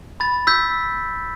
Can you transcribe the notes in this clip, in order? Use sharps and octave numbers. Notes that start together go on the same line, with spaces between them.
B5 A6
E6 G6 B6